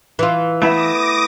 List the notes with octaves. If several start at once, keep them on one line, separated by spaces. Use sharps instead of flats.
E3 F4
A3 B3 E4 E5 D6 D#6 A#6